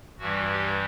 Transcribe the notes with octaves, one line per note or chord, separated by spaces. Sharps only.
G2 E3 G3 F#4
G4